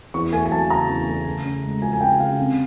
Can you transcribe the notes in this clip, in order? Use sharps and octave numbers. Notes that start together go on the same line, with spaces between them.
E2 C#6
A3 G#5
G#5
F#3 A5
C#3 A#5
E2
A3
C#3
C#3
G#3
F3 G#5
G#5
C#3 G5
C#3 F5
C3